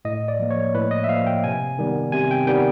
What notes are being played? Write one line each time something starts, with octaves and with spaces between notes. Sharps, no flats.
A2 D#5
D5
F3 A#3
C#5
A2 B4
D#5
E5
F3 A#3 F5
G5
C3 G#5
D#3 G3 B3
C3 G#5
G5
D#3 G3 B3 G5